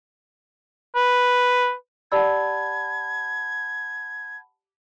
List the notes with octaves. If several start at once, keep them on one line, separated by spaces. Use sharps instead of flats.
B4
G4 D5 F#5 A5 B5 E6 G#6